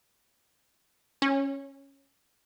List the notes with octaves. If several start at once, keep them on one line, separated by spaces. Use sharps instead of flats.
C#4